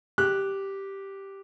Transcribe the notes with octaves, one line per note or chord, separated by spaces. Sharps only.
G4 F#6